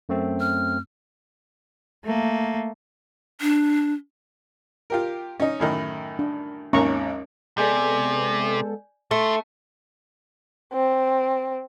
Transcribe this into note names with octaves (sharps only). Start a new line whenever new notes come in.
F#2 A3 C4
F6
A3 A#3
D4
F4 G4 A#4
C#4 D#4
F#2 A2 D#3
D4
G#1 D#2 C#4 A#5 C#6
C3 G#3 B3 A4 D5 G#5 G6
A3 D#4 C6
C4